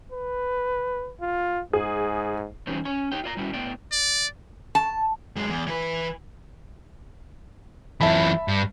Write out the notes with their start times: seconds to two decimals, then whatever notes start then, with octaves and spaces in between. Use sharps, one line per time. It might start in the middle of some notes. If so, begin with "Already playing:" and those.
0.12 B4
1.20 F4
1.73 G#2 G#4
2.67 E3 F#3 G3 C4 C#4 D#4
2.85 C#4 G#5
3.12 D#4 G4 C#5 G5
3.24 F4 D5 A#5
3.37 G3 C#4 E4 F#4
3.54 A2 B3 D5 G5
3.92 D5
4.75 A5
5.36 F#2 G#3
5.49 E2
5.67 E3 B4
8.01 F#2 E3 E5 A5 B5
8.48 G2